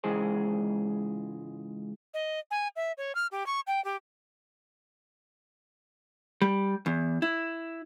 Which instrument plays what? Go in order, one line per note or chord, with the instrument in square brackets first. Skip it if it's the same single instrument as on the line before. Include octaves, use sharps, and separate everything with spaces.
[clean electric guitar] C#2 G#2 E3 G#3 G#4 C5
[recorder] D#5
G#5
E5
C#5
F6
G4
C#6
G5
G4
[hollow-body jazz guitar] G3
E2
E4